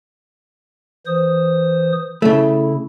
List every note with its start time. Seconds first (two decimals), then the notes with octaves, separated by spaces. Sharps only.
1.07 E3 C5 D#6
2.22 C#3 A3 E4